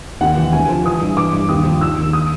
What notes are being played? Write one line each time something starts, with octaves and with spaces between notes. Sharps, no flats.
D#2 F#5
E3
D2 G#5
F3
E3 D#6
G2
E3 D6
G2
D#2 D#6
F3
D#3 E6
D#2
D#6